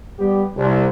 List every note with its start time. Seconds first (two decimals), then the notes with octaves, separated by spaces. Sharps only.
0.19 G3 B3 G4
0.56 C2